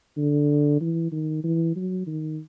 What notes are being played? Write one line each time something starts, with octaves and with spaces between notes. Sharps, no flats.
D3
E3
D#3
E3
F#3
D#3